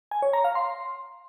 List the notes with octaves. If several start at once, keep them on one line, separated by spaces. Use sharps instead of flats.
G#5
C#5
A#5
F5
C6